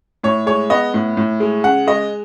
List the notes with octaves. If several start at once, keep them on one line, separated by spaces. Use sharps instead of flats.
A2 C#5
G#3 C#5
B3 D#5
A2
A2
G#3
C#3 F#5
G#3 D#5